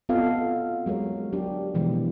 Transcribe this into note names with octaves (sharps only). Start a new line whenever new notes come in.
B3 C4 F4 A4 D#5 F5
F#3 G#3 A#4 C#5
F#3 D4 G4
B2 E3 F3 G#3